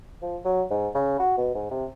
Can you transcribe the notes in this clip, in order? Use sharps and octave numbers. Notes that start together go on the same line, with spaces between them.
F3
F#3
G#2
C#3
F#4
B2
G#2
C3